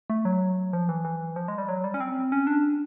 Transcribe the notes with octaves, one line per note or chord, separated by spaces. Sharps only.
A3
F#3
F3
E3
E3
F3
G#3
G3
F#3
G3
C#4
C4
C#4
D4